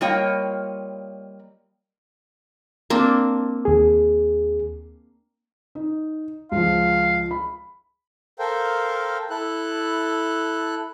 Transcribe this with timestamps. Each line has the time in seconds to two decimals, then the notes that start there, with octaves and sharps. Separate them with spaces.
0.01 G3 A#3 F4 C#5 D#5 G5
2.90 A#3 C4 D4
3.65 D#2 G#4
5.75 D#4
6.52 C#2 F3 F5
7.31 B5
8.39 A4 A#4 C5 F5 G5
9.30 E4 A4 F#6